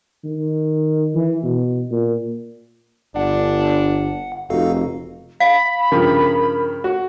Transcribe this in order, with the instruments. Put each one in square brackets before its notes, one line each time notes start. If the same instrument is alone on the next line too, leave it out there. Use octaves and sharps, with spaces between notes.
[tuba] D#3
E3
B2
A#2
[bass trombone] G1 [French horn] D4 [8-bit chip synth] F#5
[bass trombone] F1 [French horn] D#4 [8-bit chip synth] F#4 A4 F5
[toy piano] F5 [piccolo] B5
[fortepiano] G2 C#3 F3 [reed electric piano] A#4
[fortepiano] F#4